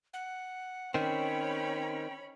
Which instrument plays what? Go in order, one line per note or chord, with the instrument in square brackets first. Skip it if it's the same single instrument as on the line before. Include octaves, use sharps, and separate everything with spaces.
[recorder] F#5
[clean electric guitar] D#3 C4 [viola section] C#4 C#5 B5 [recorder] G5